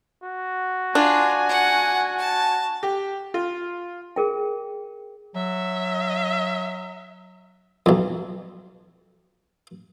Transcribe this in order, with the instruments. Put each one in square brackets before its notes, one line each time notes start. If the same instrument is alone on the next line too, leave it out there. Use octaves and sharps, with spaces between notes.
[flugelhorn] F#4
[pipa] D4 [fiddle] F4 [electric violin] G#5
[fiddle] F#5
A5
[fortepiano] G4
F4
[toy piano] G#4 A#4 G5
[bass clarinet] F#3 [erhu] E5
[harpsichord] B1 F2